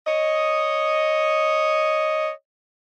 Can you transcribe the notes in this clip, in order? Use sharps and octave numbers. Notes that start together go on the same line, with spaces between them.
C#5 D#5